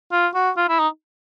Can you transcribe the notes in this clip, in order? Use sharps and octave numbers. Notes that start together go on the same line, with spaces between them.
F4
F#4
F4
E4
D#4